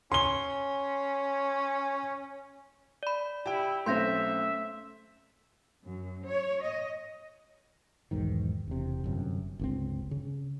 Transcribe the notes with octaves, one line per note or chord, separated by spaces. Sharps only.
C#4 C6 G7
D5 B5
E4 G4 G5
B1 A3 C4 C#4 E5 C6 G6 A#6
F#2
C#5
D#5
B1 E2 G#2 D#3
E1 C3
G1 F#2 C3
G1 C#2 C4
C#3